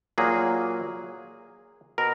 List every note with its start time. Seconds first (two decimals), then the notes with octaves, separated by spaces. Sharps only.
0.18 A#2 F#3 A#3 G#4
1.98 B2 A#4